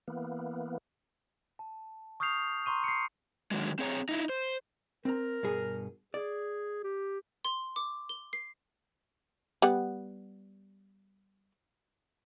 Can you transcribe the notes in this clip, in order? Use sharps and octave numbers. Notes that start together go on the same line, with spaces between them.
E3 A#3 B3
A5
C#6 D#6 F6 G6 C7 F7
A#5 C6 C#6 D#7
C7 C#7
D3 D#3 F#3 G#3
C4 G#4 C#5 A#5
D#4 E4
C5
C4 A#4 A#5
G2 B2 G#4
G#4 D5
G4
C6
D6
G7
C7
G3 B3 F#5